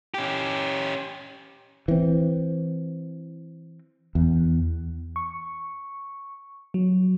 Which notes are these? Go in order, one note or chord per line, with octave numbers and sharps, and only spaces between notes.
C#4 G4
E3 C4
E2
C#6
F#3